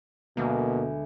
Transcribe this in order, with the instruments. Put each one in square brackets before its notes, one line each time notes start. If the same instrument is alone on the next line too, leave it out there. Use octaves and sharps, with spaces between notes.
[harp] D2 G#3 B3 [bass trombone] B2 [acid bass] A#3